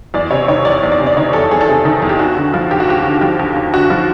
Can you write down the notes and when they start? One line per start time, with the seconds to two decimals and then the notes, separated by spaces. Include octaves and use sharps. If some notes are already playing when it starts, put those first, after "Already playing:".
0.14 E2 D5
0.31 C3 C#5
0.48 D#3 C#5
0.65 E2 D5
0.83 E2
0.92 D5
1.00 C3
1.06 D5
1.17 D#3 C#5
1.33 E2 A4
1.51 E2 G#4
1.61 A4
1.68 C3 G#4
1.85 D#3
2.02 E2
2.09 G4
2.19 D#2 F#4
2.37 D3
2.54 F3
2.70 D#2 G4
2.80 F#4
2.87 D#2 G4
3.04 D3
3.21 F3 G4
3.39 D#2
3.56 D#2
3.73 D3 F#4
3.90 F3